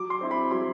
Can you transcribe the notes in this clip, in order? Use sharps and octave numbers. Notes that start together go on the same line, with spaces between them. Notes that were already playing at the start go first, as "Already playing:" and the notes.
Already playing: F#3 D6
C6
C4 E4
B5
F#3 C6